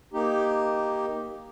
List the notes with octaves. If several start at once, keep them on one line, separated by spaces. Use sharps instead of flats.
A#3 D#4 G4